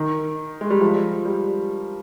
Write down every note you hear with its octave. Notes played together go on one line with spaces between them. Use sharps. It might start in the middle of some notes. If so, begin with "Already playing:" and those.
Already playing: D#3
G#3
G3
F3
G3